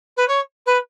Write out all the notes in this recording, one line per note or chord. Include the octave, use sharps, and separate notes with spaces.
B4
C#5
B4